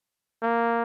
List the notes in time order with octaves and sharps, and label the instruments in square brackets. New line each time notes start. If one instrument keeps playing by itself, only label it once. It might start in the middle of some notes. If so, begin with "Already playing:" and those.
[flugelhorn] A#3